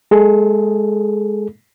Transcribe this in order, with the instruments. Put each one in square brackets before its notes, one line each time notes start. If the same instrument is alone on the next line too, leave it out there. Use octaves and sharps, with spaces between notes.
[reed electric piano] G#3 G#4 A4